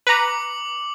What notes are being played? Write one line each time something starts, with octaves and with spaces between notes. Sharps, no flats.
B4 A#5 D6 C#7 F#7